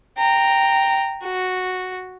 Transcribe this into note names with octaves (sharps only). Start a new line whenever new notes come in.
G5 A#5
F#4